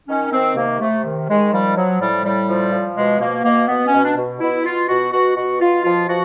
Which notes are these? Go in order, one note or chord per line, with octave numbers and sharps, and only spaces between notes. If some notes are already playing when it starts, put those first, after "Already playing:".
D#3 C#4
D#3 C4
C3 A#3
C3 A3
D#3
D#3 G#3
F3 G3
F3 F#3
A2 G3
A2 G3
F3
F3
B2 G#3
B2 A#3
B2 A#3
B2 B3
C#4
B2
D4
B2
B2 E4
B2 F4
B2 F#4
B2 F#4
B2 F#4
B2 F4
F3 F4
F3 F#4